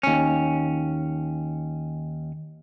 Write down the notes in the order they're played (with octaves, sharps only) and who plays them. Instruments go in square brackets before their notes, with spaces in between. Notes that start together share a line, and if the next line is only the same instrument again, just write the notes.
[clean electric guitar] D#2 C#4